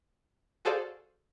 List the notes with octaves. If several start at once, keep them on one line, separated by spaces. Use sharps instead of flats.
F#4 G#4 A4 C5 D5 F5